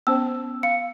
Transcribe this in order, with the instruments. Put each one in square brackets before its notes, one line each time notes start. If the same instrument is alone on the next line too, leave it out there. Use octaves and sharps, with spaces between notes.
[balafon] B3 C#4 C5 [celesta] E6
[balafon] F5 [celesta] C#7